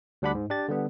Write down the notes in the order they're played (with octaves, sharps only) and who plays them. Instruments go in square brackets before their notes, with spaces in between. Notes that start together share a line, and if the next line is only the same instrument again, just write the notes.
[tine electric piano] D2 G3 D4 F#5 B5 D6
G#2
D4 G4 A6
D3 G3 B3